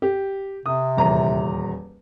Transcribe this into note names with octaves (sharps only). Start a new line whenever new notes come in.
G4
C3 D#6
D#1 E2 A#5